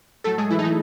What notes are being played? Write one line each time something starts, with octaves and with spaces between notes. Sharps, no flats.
A2 F#3 A3 A4
G#3 G#4
E3 E4
D#4
E3 E4